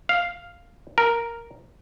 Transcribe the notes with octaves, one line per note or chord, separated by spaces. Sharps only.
F5
A#4